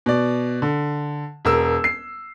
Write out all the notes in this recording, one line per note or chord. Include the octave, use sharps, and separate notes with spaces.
B2 D5
D3
E1 A#4 E6
C7